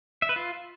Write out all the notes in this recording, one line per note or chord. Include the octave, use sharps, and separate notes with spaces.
E5
B4
F4